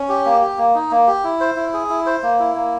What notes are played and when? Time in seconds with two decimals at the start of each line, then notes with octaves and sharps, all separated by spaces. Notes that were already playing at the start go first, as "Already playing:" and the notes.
Already playing: C#4
0.09 G4
0.25 A#3
0.42 G4
0.58 A#3
0.75 D#4
0.91 A#3
1.07 G4
1.24 E4
1.40 C5
1.57 E4
1.73 G#4
1.90 E4
2.06 C5
2.23 A#3
2.39 E4
2.55 A#3